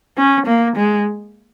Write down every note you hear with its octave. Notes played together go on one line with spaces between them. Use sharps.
C#4
A#3
G#3